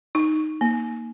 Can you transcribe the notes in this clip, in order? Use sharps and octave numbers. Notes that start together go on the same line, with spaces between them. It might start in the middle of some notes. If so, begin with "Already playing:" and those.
D#4
A#3